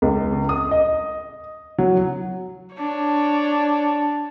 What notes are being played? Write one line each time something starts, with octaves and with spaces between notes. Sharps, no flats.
C#2
D#6
D#5
F#3
D4 C#5